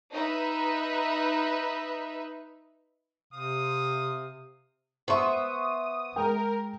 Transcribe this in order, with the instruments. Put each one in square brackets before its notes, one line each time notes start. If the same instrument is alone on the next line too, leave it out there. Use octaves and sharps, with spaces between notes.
[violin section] D#4 B4 E5
[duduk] C3 [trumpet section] C4 F5 D#6
[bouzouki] B3 E5 [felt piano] C5 C6 C#6 [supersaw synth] D#6
[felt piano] G#3 G5 [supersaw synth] A#4